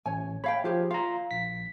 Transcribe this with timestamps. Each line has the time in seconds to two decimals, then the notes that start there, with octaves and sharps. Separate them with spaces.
0.06 A1 C#5 G#5
0.44 C#5 F5 G5 B5
0.64 F3 F4 G4 G#4
0.91 F4 F5 A#5
1.31 A#1 B6